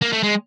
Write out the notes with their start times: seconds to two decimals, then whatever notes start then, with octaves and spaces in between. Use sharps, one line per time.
0.02 A#3
0.13 A3
0.24 G#3